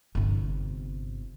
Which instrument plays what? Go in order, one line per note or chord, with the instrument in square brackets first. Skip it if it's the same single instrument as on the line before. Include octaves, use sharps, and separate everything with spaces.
[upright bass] G1 C3